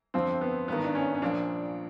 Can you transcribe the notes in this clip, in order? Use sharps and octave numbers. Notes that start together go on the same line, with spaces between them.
G1 F2 D3 F3 C4
B3
G#1 G2 D#3 B3
D4
C#4
C#4
A#1 A#2 F3 D4